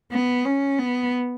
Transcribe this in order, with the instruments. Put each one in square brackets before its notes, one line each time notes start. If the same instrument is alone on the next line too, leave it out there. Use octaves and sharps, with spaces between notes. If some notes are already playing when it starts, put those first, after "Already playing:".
[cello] B3
C#4
B3